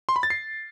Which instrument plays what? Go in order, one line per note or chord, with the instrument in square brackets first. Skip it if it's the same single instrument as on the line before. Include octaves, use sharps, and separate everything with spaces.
[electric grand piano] C6
B5
A6
C7